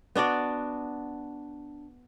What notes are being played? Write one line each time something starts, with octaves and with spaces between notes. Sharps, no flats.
B3 D4 F#4 D5